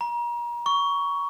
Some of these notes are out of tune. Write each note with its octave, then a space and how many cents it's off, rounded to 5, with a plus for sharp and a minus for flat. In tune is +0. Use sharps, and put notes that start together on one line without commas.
A#5 +35
C#6 +15